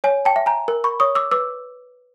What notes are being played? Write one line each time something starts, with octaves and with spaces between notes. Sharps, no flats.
C#5 G#5
G5 A5
E5
G#5 A#5
A#4
B5 C#6
C#5 C#6 D#6
D6 E6
B4 D6 E6